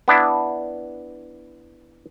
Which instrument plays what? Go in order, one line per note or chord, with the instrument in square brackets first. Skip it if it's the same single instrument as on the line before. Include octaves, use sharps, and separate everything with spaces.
[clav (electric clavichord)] B3 D4 E4